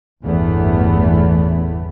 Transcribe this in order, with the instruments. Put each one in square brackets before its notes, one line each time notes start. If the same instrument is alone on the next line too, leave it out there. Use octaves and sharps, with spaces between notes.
[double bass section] G1 E2 A2 E3 A3 B3